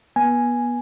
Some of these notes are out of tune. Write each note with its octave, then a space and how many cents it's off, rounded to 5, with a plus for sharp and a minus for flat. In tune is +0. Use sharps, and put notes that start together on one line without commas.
B3 -30 G#5 +0